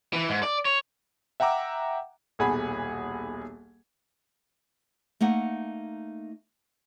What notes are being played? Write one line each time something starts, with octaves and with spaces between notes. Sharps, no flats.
E3
G#2
D5
C#5
E5 F#5 G5 A#5 D6 E6
D#1 B1 G#4 F#5 B5
A3 A#3 D#4 F#5